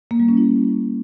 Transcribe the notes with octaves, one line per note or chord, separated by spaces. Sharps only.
A#3
G3
C#4
E4